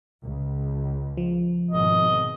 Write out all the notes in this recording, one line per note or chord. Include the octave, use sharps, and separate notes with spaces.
C#2
F3
G#1 B2 D#5